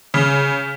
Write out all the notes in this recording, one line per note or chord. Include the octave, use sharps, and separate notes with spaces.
C#3